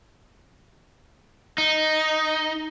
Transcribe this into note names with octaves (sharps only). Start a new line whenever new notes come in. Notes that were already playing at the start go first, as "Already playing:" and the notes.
D#4